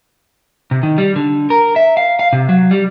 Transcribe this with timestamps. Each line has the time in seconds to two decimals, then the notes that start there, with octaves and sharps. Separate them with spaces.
0.71 C3
0.83 D#3
0.98 G3
1.16 D3
1.50 A#4
1.76 E5
1.97 F5
2.19 F5
2.33 C3
2.49 F#3
2.71 G3